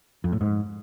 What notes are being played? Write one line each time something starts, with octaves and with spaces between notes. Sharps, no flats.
F2
A2
G#2